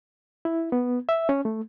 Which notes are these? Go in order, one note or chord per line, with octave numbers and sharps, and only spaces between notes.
E4
B3
E5
C#4
A3